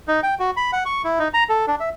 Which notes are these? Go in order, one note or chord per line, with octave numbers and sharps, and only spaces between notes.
D#4
G5
F#4
B5
F#5
C#6
E4
D#4
A#5
A4
D4
E5